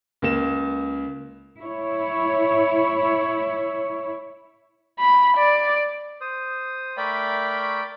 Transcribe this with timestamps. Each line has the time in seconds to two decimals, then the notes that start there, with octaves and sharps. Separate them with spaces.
0.22 C#2 A#3 E7
1.59 E4 C#5
5.00 B5
5.37 D5
6.21 C5 D#6
6.97 A3 A#4 D5 E5 G5 B5